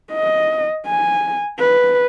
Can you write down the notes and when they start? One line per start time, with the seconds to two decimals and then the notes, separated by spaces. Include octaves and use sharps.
0.13 D#5
0.86 G#5
1.59 B4